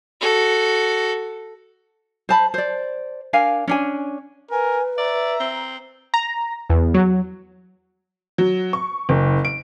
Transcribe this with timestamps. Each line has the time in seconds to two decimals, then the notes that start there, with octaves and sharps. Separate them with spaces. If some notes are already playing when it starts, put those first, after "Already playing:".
0.21 F#4 A4
2.29 C5 A5 B5
2.54 C5 D5
3.33 D4 A#4 F5 G#5
3.68 C#4 D4 G#5
4.51 A#4 B4 G#5
4.98 D5 E5 A#5
5.40 C4
6.14 A#5
6.70 E2
6.94 F#3
8.38 F#3
8.73 C#6
9.09 F#1
9.45 D7